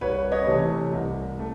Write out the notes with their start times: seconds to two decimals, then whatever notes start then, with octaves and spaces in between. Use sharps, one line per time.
0.01 C2 B4 C#5
0.32 C#5 D#5
0.47 C3 E3 A3
0.93 C2
1.39 A3